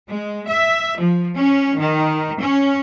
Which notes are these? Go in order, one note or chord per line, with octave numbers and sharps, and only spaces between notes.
G#3
E5
F3
C#4
D#3
C#4